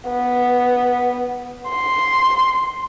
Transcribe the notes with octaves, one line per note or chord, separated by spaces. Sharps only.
B3
C6